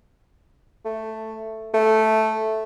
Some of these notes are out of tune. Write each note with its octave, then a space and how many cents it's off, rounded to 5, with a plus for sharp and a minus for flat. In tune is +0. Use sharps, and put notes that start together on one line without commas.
A3 +5
A3 -5